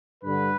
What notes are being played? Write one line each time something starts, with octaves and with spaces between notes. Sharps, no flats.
G2 D3 B4